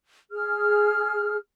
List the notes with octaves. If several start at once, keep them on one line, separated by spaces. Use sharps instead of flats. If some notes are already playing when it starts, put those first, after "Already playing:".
G#4 F6